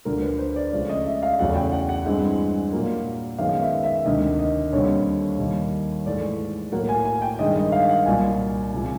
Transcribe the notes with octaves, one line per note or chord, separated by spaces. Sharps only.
D2 D3 F3 A#4
B4
C5
D5
C#2 C#3 F3 A3 D5
D#5
E5
F5
E2 C#3 F#3 A3 F#5
G5
F#5
F#5
G2 E3 G#3 C4
A#2 F#3 A#3
F#2 D#3 G#3 B3 F5
E5
E5
D2 C3 D#3 D#5
D#5
D#2 D3 G3 C4 C#5
D#2 D#3 G3
G#2 E3 A3 D5
A2 F#3 A#3 F#5
G#5
G#5
G5
G2 D#3 G#3 D#5
D#5
F5
F#5
C2 A#2 F#3 G#5
C#2 C3 F3